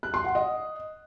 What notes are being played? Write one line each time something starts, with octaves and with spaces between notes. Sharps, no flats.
F#6
C6
F#5
D#5